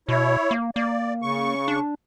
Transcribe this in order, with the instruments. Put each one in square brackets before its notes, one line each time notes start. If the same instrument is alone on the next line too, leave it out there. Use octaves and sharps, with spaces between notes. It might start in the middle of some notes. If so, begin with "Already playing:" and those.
[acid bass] B2 [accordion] E4 C#5
[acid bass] A#3
[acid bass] A#3 [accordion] D5
[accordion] C#3 C#6
[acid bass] D4